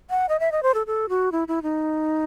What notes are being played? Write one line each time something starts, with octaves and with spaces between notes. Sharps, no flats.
F#5
D#5
E5
D#5
C5
A4
A4
F#4
E4
E4
D#4